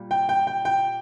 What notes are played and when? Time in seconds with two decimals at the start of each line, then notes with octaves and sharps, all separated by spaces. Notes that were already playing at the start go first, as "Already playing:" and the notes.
Already playing: A#2 G3
0.11 G5
0.29 G5
0.47 G5
0.65 G5